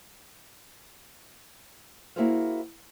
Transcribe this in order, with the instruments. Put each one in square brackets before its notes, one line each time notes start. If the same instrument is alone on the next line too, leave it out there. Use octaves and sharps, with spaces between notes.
[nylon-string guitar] A#3 E4 F#4 G#4 C5 F5